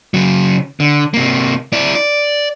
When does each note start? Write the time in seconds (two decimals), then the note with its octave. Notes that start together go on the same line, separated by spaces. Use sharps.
0.14 C#3 F#3
0.80 D3
1.14 C3 A#3
1.73 E4 D5
1.95 D5